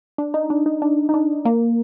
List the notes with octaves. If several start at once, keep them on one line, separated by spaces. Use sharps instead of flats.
D4
D#4
D4
D#4
D4
D#4
D4
A#3